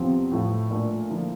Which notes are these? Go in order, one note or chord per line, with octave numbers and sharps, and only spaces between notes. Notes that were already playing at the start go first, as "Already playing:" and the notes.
Already playing: E2 C3 F3 C4
A2 F3 A3
A#2 A3 D4
D3 F3 A#3 E4